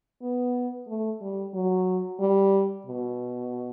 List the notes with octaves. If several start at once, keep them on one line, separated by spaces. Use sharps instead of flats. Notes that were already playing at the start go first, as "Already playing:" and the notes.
B3
A3
G3
F#3
G3
B2